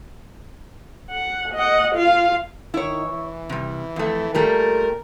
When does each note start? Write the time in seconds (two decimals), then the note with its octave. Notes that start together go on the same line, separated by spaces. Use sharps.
1.10 F#5
1.54 D#5 F#5
1.95 F4 F5
2.74 D#3 E4 C#5
3.05 E3
3.49 C3 G3
3.96 F2 A3
4.35 A#2 G3 A3 A#4